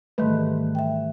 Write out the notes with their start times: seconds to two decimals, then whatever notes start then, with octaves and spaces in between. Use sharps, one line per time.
0.18 G#2 D#3 E3 G3 A3 B4
0.75 E5 G5